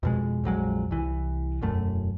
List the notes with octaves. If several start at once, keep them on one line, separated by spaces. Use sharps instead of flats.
F2 B2 G#3
A#1 F2 F#3 G#3
C2 E3
E1 F#2 A3